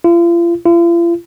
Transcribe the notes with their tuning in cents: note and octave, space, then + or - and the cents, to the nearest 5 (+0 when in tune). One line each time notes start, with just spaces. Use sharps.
F4 -40
F4 -45